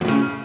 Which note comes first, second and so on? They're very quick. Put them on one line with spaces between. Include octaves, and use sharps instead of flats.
E2 A2 C#3